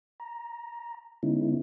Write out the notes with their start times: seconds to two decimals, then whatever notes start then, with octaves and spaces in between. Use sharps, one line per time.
0.20 A#5
1.23 D3 G#3 B3 C#4 D#4 E4